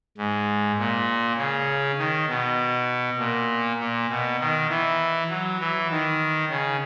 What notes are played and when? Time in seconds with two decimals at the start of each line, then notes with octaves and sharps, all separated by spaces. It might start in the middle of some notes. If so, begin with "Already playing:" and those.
0.18 G#2
0.78 A#2
1.37 C#3
1.98 D#3
2.28 B2
3.18 A#2
3.79 A#2
4.09 B2
4.40 D#3
4.69 E3
5.30 F#3
5.60 E3
5.90 D#3
6.50 C#3